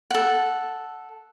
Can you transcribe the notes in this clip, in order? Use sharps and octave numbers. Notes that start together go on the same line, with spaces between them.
A4 F#5